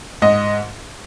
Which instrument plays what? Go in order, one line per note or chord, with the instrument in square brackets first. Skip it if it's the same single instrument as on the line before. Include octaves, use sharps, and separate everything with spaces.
[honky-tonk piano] G#2 D#5